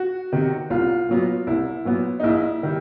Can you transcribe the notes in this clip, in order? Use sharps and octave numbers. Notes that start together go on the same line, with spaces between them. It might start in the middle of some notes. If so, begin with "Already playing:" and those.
Already playing: F#4
C3 D#3
C2 F4
A#2 F#3 B3
C2 E4
A#2 F#3 B3
D#4
A#1 E4
D#3 G3